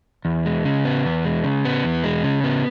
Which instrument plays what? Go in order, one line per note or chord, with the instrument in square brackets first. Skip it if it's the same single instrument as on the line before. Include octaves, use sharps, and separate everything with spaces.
[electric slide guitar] E2
G#3
C#3
B3
E2
G#3
C#3
B3
E2
G#3
C#3
B3